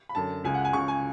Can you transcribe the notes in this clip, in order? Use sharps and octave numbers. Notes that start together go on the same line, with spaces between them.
B5
F#2 D3 A5
C#2 C#3 G#5
F#5
G#5
C#2 C#3 C#6
G#5